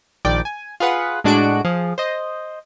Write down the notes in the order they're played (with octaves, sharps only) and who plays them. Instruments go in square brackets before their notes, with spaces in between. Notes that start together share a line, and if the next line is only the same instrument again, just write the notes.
[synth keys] A#1 D#3 D5 G5 D6
G#5
F4 G#4 B4 F#5
A2 G#3 D4 F#4 F#6 D7
F3 G#4
C5 D#5